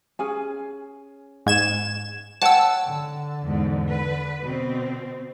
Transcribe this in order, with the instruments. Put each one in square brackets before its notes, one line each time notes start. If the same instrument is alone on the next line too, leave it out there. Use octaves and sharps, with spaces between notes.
[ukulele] C#4 G#4 G#5
[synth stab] G#2 G#6 E7
[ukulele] C#5 F#5 G5 [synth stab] A5 E6
[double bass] D3
[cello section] E2 G#2
B4
B2 C4